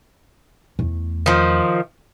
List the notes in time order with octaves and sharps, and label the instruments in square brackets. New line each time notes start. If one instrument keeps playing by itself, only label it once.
[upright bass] E2 A3
[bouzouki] D#3 F3